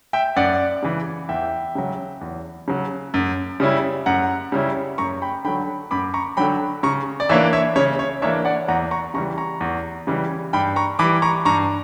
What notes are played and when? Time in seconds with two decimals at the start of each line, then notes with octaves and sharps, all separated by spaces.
0.13 E5 G5
0.36 F#2 D5 F#5
0.83 C#3 E3
1.29 E2 E5 G5
1.75 C#3 F#3
2.21 E2
2.68 C#3 F#3
3.14 F#2
3.60 C#3 G3 C#4 E4
4.06 F#2 F#5 A#5
4.52 C#3 G3 C#4 E4
4.98 F#2 A#5 C#6
5.22 G5 B5
5.44 D3 G5 B5
5.48 F#3
5.91 F#2 B5 D6
6.14 A#5 C#6
6.37 D3 F#3 G5 B5
6.83 C#3 A#5 C#6
7.20 D5
7.29 E3 A#3 D4 C#5 E5
7.53 C#5 E5
7.76 C#3 C#5
7.99 C#5
8.22 E3 A#3 D4 C#5 E5
8.45 D5 F#5
8.68 E2 F#5 A#5
8.91 A#5 C#6
9.14 C#3 E3 G3 A#5 C#6
9.38 A#5 C#6
9.61 E2
10.07 C#3 E3 G3
10.53 G2 G5 B5
10.76 A#5 C#6
10.99 E3 G3 B5 D6
11.22 A#5 C#6
11.45 G2 A#5 C#6